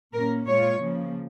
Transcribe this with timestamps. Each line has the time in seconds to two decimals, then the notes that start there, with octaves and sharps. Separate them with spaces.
0.14 A#2 A#3 C#4 A#4
0.47 A#2 G#3 F4 C#5
0.80 C#3 F3 A#3